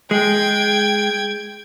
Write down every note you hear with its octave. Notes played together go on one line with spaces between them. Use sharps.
G#3 G5 G#6